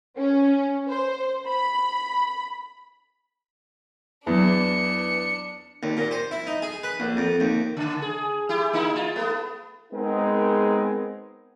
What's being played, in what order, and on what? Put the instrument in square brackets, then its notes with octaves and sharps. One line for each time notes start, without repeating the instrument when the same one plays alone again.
[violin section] C#4
C5
B5
[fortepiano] E2 [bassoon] E3 [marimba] F#3 E4 [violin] D4 C#7
[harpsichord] D#2
A#2
C5
E4
D#4
G#4
B4
A#1
F2
D#2
[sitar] C#3
G#4
E4 G4
A#3 D#4 E4
F4
A3 B3
[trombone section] G#3 B3 C4 D#4 G#4 A#4